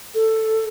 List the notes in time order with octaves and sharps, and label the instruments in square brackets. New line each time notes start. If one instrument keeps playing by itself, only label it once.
[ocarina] A4